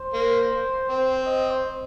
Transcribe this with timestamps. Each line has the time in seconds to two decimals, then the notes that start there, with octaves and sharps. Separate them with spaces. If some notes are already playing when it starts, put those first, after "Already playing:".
Already playing: C5
0.14 A#3
0.88 C4
1.26 D#5
1.51 C5